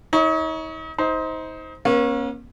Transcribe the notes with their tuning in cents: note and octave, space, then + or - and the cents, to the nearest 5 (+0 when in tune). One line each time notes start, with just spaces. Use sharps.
D#4 +40 C#5 +0
D#4 +30 C5 +0
A#3 +40 C#4 -25